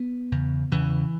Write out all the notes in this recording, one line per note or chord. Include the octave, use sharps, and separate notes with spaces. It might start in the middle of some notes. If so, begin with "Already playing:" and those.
Already playing: B3
E2 C#3
E2 C#3 E3